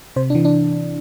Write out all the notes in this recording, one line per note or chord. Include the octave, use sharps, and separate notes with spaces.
C3 C5
D4
E3
D4